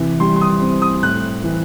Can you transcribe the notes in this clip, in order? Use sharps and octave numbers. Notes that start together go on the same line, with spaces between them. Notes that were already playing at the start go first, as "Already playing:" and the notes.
Already playing: C3 E3
G3 C6
C6
D#6
C4
D#6
A2 F#6
E3